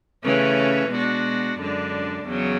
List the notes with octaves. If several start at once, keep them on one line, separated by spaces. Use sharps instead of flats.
C#3 E3 A3 C#4
B2 G#3 D4 F#4
F#2 D3 G#3 D4
E2 C#3 F#3